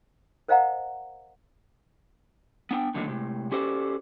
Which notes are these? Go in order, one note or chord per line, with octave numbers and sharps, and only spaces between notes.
A#4 C5 D#5 F5 F#5 A#5
B3 D4 G5
A2 D3 D#3 F#3 A#3
A2 C3 G#3
C#4 F#4 G4 A4 C5 D5